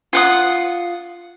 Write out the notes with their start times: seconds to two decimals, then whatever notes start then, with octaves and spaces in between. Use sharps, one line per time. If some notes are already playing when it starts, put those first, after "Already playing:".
0.13 F4 F#5 D#6